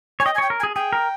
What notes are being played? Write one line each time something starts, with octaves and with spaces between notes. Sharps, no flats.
C#5 G#5
D#5 G5
G#5
C#5 G5
A#4
G#5
G#4
G#4 G5
A#4